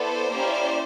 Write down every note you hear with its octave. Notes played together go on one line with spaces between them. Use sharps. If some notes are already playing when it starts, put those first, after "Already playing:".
Already playing: B3 E4 A4 C5 D5
A#3 C#4 E4 G4